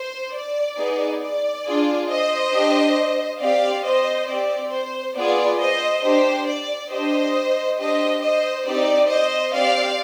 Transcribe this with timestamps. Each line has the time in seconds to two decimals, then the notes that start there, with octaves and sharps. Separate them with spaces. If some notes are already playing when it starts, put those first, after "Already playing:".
Already playing: C5
0.33 D5
0.77 B3 D#4 G#4
1.21 D5
1.65 D4 F4 G#4
2.09 C5 D#5
2.53 D4 G4
3.40 C4 G4 D5 F5
3.84 C5 D#5
4.28 C4 G4 D5
4.71 C5
5.15 B3 F4 G#4 D5
5.59 C5 D#5
6.03 D4 G4 C5
6.46 D5
6.90 D4 G4 C5 D#5
7.78 D4 G4 C5 D#5
8.21 C5 D#5
8.65 C4 D#4 G4 D5
9.09 C5 D#5
9.53 C4 G4 D5 F5